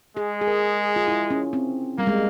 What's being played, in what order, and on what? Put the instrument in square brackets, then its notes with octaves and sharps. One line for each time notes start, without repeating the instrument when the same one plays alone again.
[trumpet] G#3 [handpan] G#4
[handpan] G#4
A#4
F4
E4
C#4
C4
[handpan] G3 [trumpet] A#3
[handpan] G#3